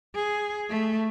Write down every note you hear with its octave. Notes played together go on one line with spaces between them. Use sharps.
G#4
A3